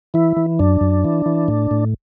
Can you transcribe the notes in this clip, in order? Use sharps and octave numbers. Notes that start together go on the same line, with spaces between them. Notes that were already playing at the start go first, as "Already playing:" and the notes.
E3 E4
E3
F#2 D4
F#2
E3
E3
A2
A2